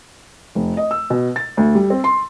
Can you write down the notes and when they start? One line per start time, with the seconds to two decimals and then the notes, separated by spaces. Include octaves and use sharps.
0.55 F1
0.77 D#5
0.91 E6
1.10 B2
1.36 A6
1.57 D2
1.75 G3
1.90 C4
2.04 C6